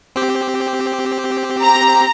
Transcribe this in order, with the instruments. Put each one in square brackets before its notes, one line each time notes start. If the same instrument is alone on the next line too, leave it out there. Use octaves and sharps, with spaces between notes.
[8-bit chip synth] C4 G4
[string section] A#5